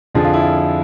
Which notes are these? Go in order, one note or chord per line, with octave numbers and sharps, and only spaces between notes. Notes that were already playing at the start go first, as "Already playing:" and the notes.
F2 D3 F3 G#4
F4
E4
F4